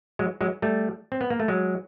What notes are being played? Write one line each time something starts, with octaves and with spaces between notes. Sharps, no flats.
F#3 G#3
F#3 G#3
G3 A3
C4
B3
A#3
A3
F#3 G#3